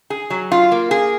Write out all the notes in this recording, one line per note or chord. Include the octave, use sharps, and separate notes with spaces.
G#4
F#3
F4
A#3
G#4